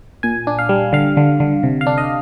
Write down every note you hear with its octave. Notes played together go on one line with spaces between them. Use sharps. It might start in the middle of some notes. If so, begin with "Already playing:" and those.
A#2 G#5
D4
F5
G3
D3 F5
D3
D3
C3
F5
D4
D#5